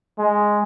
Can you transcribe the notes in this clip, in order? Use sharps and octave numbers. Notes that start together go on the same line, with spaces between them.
G#3